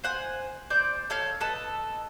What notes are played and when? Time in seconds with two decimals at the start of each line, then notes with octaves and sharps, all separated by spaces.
0.04 C5 F#5 G#5
0.70 C5 D5 G6
1.10 A4 C#5 F5
1.40 A4 B4 D#5 A5